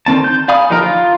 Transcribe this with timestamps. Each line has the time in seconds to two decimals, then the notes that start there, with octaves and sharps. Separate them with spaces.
0.06 D3 D#3 C4 A5
0.24 G6
0.48 D5 F5 G#5 B5 D#6
0.70 D3 F3 D#4 G4 A#4
0.82 F4